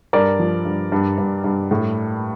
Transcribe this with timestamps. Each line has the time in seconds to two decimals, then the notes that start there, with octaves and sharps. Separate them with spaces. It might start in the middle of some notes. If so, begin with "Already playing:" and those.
0.13 G2 A#4 D5
0.39 F3
0.65 G2
0.92 G2
1.18 G2
1.44 G2
1.71 A2